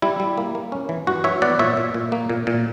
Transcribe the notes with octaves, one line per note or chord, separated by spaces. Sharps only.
G3 E4
G3
A#3
A#3
C#4
E3
G2 F#4
E3 C#5 E5
B3 D5 F#5
A#2 C#5 E5
A#2
A#2
A#3
A#2
A#2